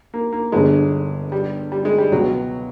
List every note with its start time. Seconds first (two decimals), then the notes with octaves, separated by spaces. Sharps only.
0.14 A#3
0.33 A#3
0.52 G1 G2 D3 G#3
1.32 G3
1.72 G3
1.85 G#3
1.98 G3
2.11 C#2 B2 F#3 G#3